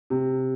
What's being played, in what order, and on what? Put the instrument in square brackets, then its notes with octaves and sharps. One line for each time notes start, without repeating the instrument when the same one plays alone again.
[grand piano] C3